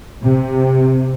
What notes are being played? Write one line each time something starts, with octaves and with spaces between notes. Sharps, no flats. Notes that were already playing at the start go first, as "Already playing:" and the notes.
C3